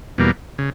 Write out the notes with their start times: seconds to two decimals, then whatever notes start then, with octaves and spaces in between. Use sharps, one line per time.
0.18 E2 B2 G3 A#3
0.58 C#3